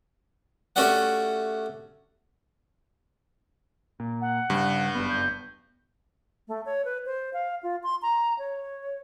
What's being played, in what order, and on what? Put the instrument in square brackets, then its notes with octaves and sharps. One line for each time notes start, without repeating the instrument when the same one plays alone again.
[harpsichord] A3 C#4 F#4 G4 D5 F#5
[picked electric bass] A#2
[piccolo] F#5
[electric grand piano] G2 [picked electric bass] C#3 G3
[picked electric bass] F#1 B3
[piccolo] G6
[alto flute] A3
C#5
B4
C5
F5
F4
C6
A#5
C#5